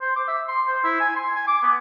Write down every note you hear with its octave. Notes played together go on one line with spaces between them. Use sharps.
C5
D6
E5
C6
C5
E4
G#5
C6
G#5
D6
B3